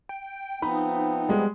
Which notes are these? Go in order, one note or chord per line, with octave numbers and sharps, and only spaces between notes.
G5
F3 B3 C4 D#4 B5
G3 G#3